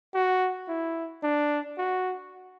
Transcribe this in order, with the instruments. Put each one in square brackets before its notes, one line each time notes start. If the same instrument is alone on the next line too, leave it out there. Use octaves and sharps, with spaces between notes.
[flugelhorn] F#4
E4
D4
F#4